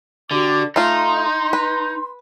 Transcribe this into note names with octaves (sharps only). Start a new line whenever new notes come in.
D3 F#4 G4 D6
A3 D#4 F4 C6
B4